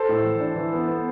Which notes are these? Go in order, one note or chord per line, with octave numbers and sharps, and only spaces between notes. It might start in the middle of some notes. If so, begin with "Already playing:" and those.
Already playing: A4 C5
A2
E3
D4
E3
B3
B3